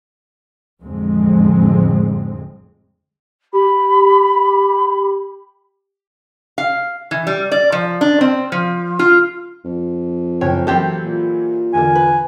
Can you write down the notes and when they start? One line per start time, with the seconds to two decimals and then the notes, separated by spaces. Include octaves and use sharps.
0.82 A1 F2 D3 G#3 C4
3.53 G4 B5
6.58 F5
7.11 E3
7.27 G3
7.52 D5
7.72 F3
8.01 D4
8.21 C4
8.52 F3
8.99 F4
9.65 F2
10.41 F#1 C#5 G5
10.67 E3 F#3 A#3 C4 G4 A4
11.05 A#2
11.73 E2 D3 A#3 G#5
11.95 B4